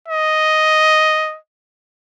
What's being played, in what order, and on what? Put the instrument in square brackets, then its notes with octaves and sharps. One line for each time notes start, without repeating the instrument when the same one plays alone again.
[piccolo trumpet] D#5